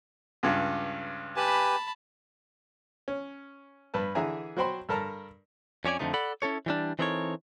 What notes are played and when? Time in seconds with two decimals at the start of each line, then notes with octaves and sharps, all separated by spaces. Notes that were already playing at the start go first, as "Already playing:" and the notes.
0.43 C#2 G2
1.36 G4 B4 G#5 A5 B5
3.08 C#4
3.94 G2 B4 A5
4.15 D3 E3 G#4 E5 G#5 A#5
4.57 F#3 F#4 C5 G5 B5 C6
4.89 G2 A4 A#4 A5 A#5
5.85 F2 C#4 C#5 D5 G#5
5.99 F2 A#2 D3 F3 A3 D#4
6.14 A4 D5 F#5 B5
6.42 C#4 E4 A4 C#5
6.66 E3 G3 D4
6.99 E3 C4 D#4 A4 A#4 C#5